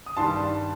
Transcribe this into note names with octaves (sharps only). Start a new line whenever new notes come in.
D#6
G2 D#3 G3 A5 C6